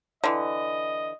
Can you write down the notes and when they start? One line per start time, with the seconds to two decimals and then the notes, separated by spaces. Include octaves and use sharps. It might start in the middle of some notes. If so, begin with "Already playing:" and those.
0.24 D3 E3 D#5